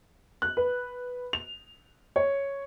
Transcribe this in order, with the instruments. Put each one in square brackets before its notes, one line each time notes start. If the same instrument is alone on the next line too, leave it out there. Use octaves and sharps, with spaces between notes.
[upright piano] F#6
B4
F7
C#5